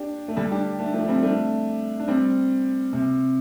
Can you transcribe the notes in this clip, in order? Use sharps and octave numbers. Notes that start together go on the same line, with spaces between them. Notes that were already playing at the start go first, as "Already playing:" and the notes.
Already playing: D4 G4
A3
D3 G3
D4 G4
A3 D4
F3 A3
G3 C4
A3 D4
D4
G3 C4
C3